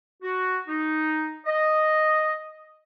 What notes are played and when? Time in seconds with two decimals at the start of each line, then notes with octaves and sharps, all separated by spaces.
0.22 F#4
0.68 D#4
1.45 D#5